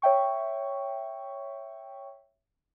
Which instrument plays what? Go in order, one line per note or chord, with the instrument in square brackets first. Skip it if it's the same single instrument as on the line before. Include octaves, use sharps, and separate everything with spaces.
[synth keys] C#5 E5 G5 C#6